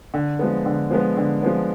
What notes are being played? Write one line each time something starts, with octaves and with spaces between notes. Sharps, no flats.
D3
F3 G#3 B3
D3
F3 G#3 B3
D3
F3 G#3 B3